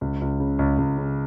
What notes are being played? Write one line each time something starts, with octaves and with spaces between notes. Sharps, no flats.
C#2
C#2
C#3
C#2
C#2
C#3